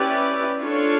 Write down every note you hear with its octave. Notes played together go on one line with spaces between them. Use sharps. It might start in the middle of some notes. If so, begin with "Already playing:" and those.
Already playing: C#4 E4 G4 B4 D5
D4 F4 A4 C#5